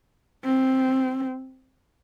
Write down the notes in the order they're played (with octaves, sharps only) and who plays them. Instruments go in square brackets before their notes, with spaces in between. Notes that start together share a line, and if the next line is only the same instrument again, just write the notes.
[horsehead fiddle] C4